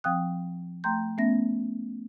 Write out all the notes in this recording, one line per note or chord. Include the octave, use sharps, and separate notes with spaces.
F3 C4 F5 G5 D#6 F#6
A3 G5 A#5 C6 G6
A3 B3 C#4 E5 A#6